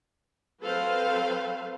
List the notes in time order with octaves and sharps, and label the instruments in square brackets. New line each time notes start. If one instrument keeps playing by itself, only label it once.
[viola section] F#3 C4 A4 B4 C5 F5